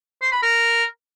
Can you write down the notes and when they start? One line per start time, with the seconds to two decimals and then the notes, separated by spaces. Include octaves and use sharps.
0.22 C5
0.32 B5
0.43 A#4